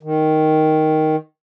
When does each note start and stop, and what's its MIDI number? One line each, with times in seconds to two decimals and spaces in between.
0.03 1.16 51